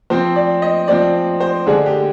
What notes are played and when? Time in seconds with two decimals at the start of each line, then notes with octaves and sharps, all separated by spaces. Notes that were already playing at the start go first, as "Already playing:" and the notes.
0.10 F3 C4 C5
0.36 D5
0.62 D#5
0.88 F3 C4 D5
1.40 C5
1.66 D3 G#3 D4 G#4
1.86 G4